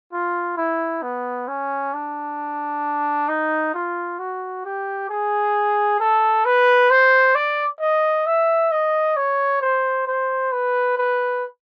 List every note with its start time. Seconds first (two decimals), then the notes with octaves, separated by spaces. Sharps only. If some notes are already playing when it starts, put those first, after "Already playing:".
0.13 F4
0.57 E4
1.02 B3
1.48 C#4
1.94 D4
3.28 D#4
3.74 F4
4.19 F#4
4.65 G4
5.09 G#4
6.00 A4
6.45 B4
6.90 C5
7.35 D5
7.80 D#5
8.26 E5
8.72 D#5
9.16 C#5
9.61 C5
10.07 C5
10.52 B4
10.97 B4